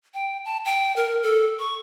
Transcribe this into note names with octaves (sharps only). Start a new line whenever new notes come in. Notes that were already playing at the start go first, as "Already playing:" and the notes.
G5
A5
G5
A#4
A4
C#6